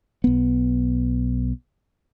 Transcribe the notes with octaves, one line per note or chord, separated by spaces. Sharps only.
B1 B3